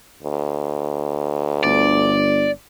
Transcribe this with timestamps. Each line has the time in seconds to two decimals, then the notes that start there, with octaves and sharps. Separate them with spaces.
0.23 D2
1.64 G1 D5